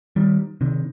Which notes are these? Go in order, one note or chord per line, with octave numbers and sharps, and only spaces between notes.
D#3 G3
C3 D#3